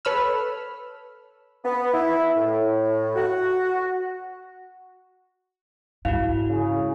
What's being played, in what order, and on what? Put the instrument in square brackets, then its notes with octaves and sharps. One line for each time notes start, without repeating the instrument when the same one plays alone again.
[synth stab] A4 B4 C#5 B5 E6 F6
[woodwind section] B3
E4
A2
F#4
[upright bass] G#2 [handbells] E4 F#4 [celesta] F5
[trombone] C#3